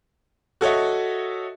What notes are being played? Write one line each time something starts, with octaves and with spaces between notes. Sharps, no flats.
F#4 A4 C#5 D#5 E5